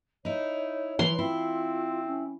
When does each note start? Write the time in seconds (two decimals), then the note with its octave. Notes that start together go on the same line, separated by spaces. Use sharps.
0.25 D#4 E4 C#5
0.99 E3 F#3 C6
1.19 C4 E4 F4
2.06 C#4